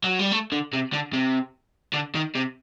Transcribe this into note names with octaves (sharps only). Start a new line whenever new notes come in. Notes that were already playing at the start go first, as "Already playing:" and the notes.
F#3
G3
A3
D3
C3
D3
C3
D3
D#3
C3